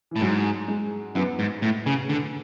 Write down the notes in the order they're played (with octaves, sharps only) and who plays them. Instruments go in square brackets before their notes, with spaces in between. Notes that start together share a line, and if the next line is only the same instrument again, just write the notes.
[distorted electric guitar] A2 [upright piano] E3
[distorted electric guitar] G#2 [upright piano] F#3
[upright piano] G#3
[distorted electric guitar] F#2 [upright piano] B3
[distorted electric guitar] G#2
A2
C#3
D3